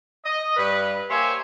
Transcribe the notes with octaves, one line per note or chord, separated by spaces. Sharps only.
D#5
G2 B4
A#3 G4 C5 C#5 E5 G#5